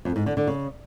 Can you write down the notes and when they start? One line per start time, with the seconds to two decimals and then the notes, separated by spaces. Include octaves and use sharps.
0.05 F2
0.16 G#2
0.26 D3
0.37 D3
0.47 C#3